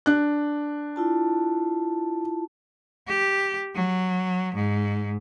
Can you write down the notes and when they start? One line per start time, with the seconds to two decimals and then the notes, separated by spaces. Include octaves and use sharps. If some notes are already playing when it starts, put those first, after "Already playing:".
0.06 D4 F#6
0.96 E4 F4 A5
3.07 G4
3.75 F#3
4.55 G#2